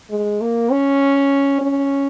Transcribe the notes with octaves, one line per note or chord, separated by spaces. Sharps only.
G#3
A#3
C#4
C#4